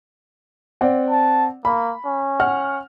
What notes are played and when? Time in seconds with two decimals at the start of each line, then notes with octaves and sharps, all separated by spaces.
0.81 C4 D5 F#5
1.10 A5
1.65 A#3 B5
2.05 C#4
2.40 F#5 F6